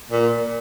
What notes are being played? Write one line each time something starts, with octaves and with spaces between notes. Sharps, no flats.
A#2